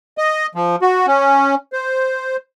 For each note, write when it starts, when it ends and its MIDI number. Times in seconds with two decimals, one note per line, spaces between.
0.18 0.47 75
0.55 0.76 53
0.82 1.06 66
1.07 1.55 61
1.73 2.36 72